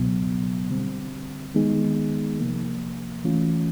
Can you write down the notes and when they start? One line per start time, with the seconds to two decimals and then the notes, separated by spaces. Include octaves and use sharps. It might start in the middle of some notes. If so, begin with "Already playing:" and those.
Already playing: C#2 B2 F#3 B3
0.70 D3 G3 C4
1.55 D#3 G#3 B3 D#4 G#4
2.39 C3 F3 A#3
3.24 E3 A3 C#4 F4